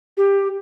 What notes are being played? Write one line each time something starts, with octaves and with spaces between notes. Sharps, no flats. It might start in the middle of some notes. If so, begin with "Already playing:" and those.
G4